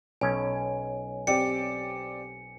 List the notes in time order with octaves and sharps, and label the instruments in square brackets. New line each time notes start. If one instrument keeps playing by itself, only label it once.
[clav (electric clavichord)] B1 C#4 [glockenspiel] G#5
[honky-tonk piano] C4 G4 D5 [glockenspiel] C#7